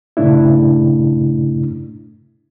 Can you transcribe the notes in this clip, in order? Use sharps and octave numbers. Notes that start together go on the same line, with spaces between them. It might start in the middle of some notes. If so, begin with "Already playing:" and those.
G2 A#2 C#3 A3 D4 E4